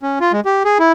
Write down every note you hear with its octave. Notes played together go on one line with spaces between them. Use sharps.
C#4
F4
G#3
G4
G#4
E4